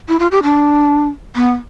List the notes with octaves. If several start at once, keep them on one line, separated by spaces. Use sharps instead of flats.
E4
F4
G4
D4
B3